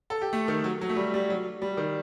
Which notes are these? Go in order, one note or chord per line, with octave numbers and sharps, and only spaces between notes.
A4
G4
A3
D#3
F#3
F#3
A3
G3
G3
F#3
G3
D#3